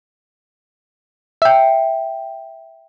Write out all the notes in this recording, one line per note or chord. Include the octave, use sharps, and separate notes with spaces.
E5 G5